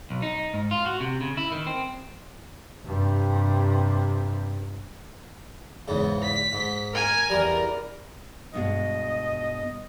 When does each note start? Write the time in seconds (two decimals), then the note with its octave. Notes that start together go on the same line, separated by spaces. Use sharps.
0.10 B1
0.22 D#4
0.54 G#2
0.71 F4
0.86 F#4
1.00 C3
1.21 C#3
1.37 E4
1.52 D#3
1.66 C4
2.85 G2 C3
5.88 E2 G#2 C#3
6.23 B6
6.53 G#2
6.93 A#4 G#5
7.30 E2 G3 A#4
8.54 G2 B2 G#3 D#5